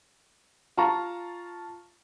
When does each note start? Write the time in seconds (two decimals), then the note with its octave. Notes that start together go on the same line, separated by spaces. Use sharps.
0.77 F4 A5 A#5 C#6